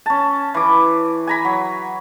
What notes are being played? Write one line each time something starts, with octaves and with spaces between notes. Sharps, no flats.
C#4 A5
E3 D6
G#5 A#5 B5
F#3